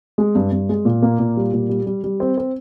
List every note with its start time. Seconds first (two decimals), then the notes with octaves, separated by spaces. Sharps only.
0.18 G#3
0.35 G2
0.52 G2
0.69 G#3
0.85 A#2
1.02 A#3
1.19 A#2
1.37 G3
1.53 A#2
1.69 G3
1.86 G3
2.04 G3
2.20 C4
2.37 C4